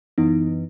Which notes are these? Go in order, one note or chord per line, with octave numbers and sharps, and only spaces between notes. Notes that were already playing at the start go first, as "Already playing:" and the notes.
F#2 E3 B3 D#4